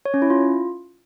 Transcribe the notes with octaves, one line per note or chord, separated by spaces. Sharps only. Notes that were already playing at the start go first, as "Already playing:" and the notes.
C#5
C#4
E4
F4